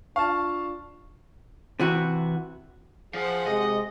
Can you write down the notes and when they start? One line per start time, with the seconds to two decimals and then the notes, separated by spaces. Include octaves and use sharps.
0.16 D4 F4 F5 A5 C#6
1.79 C3 E3 F#4
3.14 F3 G#4 C5 F#5
3.46 C3 G#3 D#5